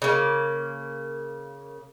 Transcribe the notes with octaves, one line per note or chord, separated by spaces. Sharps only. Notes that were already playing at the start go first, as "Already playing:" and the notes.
C#3 A#3